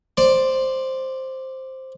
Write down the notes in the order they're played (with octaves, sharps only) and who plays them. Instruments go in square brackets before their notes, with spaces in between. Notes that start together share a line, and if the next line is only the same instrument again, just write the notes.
[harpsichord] C5 D5